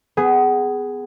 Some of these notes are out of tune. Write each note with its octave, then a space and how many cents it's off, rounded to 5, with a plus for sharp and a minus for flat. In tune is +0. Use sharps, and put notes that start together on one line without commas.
B3 +25 G#4 +0